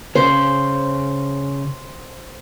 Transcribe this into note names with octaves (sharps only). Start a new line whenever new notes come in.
C#3 C5